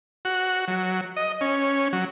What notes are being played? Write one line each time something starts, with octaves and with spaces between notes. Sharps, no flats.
F#4
F#3
D#5
C#4
F#3